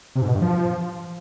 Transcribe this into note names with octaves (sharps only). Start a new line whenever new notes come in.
C3
G#2
B2
G2
F3